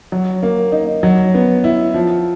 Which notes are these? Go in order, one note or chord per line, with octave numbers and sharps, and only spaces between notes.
F#3
A#3
D#4
F#3
B3
E4
F3